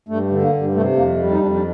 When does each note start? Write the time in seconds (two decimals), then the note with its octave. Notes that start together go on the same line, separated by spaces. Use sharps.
0.09 G2 A3
0.31 D3
0.42 A#3
0.52 G2
0.75 C3 A3
0.96 F2 A#3
1.19 G3
1.31 D#4
1.40 F2 D4
1.56 D4